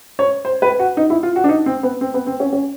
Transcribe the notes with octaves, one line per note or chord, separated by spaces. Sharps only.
C#5
C5
B4
F#4
D#4
E4
F4
F#4
D4
D#4
C4
B3
C4
B3
C4
C#4
C#4